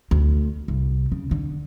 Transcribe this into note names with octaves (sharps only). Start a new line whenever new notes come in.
D2
C2
C#3
D3